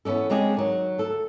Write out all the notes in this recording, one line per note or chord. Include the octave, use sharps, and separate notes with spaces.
E3 B3 C#4 D4 A4
C#3 G#3 C4 D4 G#4
D#3 F#3
D2 A4